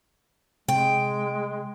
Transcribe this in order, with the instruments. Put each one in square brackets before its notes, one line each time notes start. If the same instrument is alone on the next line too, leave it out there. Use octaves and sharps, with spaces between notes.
[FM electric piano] C3 [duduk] G#3 [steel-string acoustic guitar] G5